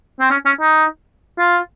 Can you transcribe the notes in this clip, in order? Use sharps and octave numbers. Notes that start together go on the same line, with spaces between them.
C4
C#4
C#4
D#4
F4